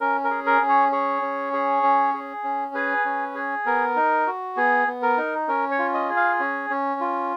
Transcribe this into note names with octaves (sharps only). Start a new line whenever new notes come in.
C#4 A#4
A#4
G#4
A#4
C#4
C#5
G#4 C#5
C#4
G#4
C#4
G#4
C#4
G#4 B4
C#4
G#4
B3 A#4
D#4
F#4
B3 G#4
B3
A#4
D#4
C#4 A#4
C#5
F4
D#5
G#4
F5
C#4
C#4
F4